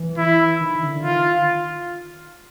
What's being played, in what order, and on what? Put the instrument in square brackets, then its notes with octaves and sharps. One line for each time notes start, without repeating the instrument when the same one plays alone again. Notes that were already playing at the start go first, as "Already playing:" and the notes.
Already playing: [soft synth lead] E3
[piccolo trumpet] E4
[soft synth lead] D#3
D3
[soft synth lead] D#3 [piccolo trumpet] F4